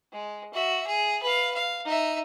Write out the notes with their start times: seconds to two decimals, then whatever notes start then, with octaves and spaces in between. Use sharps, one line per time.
0.12 G#3
0.53 F#4 E5
0.87 G#4
1.23 B4 F5
1.55 F5
1.85 D#4 E5